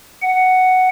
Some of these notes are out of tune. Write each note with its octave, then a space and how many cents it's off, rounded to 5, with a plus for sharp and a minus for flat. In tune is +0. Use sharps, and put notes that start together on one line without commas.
F#5 +5